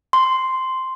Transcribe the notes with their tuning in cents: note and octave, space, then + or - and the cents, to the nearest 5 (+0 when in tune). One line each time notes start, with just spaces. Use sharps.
C6 -5